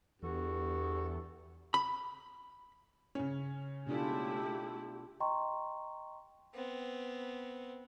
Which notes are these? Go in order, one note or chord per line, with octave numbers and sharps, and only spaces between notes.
E2 G2 F#4 A4
B5
C#3 C#4
B2 G#3 A3 D4 E4 F4 G4
D#5 G5 A#5 C6 C#6
B3 C4